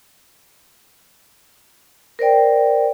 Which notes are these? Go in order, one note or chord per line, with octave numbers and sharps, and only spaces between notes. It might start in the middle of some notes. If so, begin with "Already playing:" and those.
A#4 C5 D5 G5